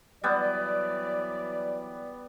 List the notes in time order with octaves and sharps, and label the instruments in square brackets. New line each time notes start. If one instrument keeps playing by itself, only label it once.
[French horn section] E3 F#3 D5 [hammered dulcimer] G3 B3